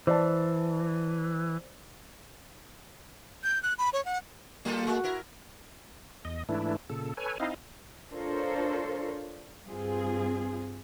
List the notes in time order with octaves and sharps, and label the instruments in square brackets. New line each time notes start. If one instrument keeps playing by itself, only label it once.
[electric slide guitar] E3 [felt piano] C5 D5 A5
[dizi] G6
F#6
B5
C#5
F#5
[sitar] F#3 F4 A4 [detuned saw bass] A#3
[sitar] G#3 A3 [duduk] F#4
[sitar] E4 A#4
[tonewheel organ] E2 D#5
G#2 E3 A3 D4 E4
A#2 C#3 A4
A4 B4 C#5 G#5
C4 D#4 E4 D#5 F5
[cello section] D4 F4 A4 A#4 C5 C#5
G2 C4 F4 G#4